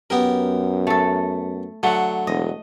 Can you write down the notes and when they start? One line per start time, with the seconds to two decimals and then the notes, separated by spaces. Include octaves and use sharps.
0.10 F#2 B3 G4 A#4
0.87 A3 A4
1.83 D3 F#3 A3 F#5
2.27 E1 D#5